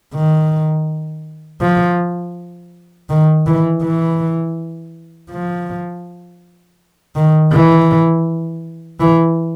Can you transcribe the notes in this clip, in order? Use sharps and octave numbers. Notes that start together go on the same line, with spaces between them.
D#3
F3
D#3
E3
E3
F3
D#3
E3
E3